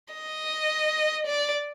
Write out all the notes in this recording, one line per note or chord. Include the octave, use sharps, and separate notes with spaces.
D#5
D5